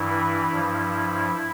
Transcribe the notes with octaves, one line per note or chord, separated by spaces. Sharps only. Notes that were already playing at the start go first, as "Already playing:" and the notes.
Already playing: G2 E3 E4
G2 F3